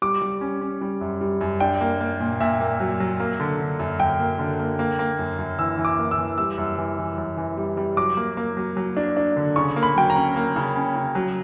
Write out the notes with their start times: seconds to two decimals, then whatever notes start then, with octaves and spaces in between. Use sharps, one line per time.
0.02 G3 D6
0.22 G3
0.41 C#4
0.61 C#4
0.81 G3
1.01 F#2
1.21 G3
1.41 F#2
1.60 D4 G5
1.81 A#3
2.00 A#3
2.20 A#2
2.40 A#2 E5
2.60 A#3
2.80 F#3
3.00 F#3
3.20 A#3
3.40 D3
3.60 D3
3.79 F#2
4.00 F#2 G5
4.19 A#3
4.39 D3
4.59 A#3
4.79 A#3
4.99 A#3
5.19 F#2
5.39 F#2
5.59 E3 E6
5.78 E3
5.85 D6
5.98 A#3
6.11 E6
6.18 E3
6.38 G3 E6
6.58 F#2
6.78 E3
6.98 E3
7.18 F#2
7.37 E3
7.57 G3
7.77 G3
7.97 F#3 D6
8.17 A#3
8.37 A#3
8.57 F#3
8.77 F#3
8.97 D4
9.17 D4
9.36 D3
9.56 C#3 C#6
9.76 A#3
9.83 B5
9.96 F#3 G5
10.10 A#5
10.16 C#4
10.36 A#3
10.56 C#3
10.76 C#4
10.96 C#3
11.15 F#3